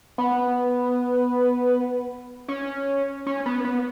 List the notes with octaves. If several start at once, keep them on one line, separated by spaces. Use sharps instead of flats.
B3
C#4
C#4
B3
B3